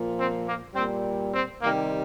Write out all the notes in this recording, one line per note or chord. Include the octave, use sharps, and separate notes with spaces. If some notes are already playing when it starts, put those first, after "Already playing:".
Already playing: A#2 F3
C4
A#3
A#2 G3 C4
C4
C3 D#3 G3 A#3